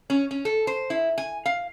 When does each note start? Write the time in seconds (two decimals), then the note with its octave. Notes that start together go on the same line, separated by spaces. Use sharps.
0.10 C#4
0.31 C#4
0.45 A4
0.67 C5
0.90 E4
1.18 G#5
1.46 F5